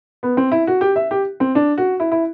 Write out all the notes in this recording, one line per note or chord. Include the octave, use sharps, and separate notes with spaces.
B3
C4
E4
F#4
G4
E5
G4
C4
D4
F#4
E4
E4